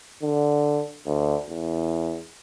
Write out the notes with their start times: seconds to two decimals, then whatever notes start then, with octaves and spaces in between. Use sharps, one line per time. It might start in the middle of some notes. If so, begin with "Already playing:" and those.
0.22 D3
1.06 D2
1.49 E2